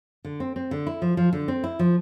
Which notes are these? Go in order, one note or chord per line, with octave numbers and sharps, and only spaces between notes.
D3
C4
C4
D3
E4
F3
F3
D3
C4
E4
F3